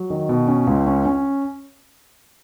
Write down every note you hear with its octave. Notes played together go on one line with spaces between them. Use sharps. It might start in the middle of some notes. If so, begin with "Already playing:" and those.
Already playing: F#3
D#3
B2
C#4
C#2
C#4
C#4